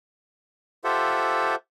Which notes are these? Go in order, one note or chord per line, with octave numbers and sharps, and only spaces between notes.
F4 G4 A4 C5 E5 F#5